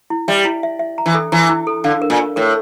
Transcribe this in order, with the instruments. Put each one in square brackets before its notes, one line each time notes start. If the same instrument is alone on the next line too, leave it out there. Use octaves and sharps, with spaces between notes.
[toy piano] E4
[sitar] G3 [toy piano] E5
[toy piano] E4
E5
E5
A#5
[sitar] E3
[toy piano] A4
[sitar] E3 [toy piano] A#5
[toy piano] E4
A4
[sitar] D3 [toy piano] F5
[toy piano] A#4
[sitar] A#2
[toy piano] A#4
[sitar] A2 [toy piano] A#4